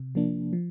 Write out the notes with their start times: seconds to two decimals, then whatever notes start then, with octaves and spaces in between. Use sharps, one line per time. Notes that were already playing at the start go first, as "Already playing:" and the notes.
Already playing: C3
0.15 F3 A#3 D4
0.53 F3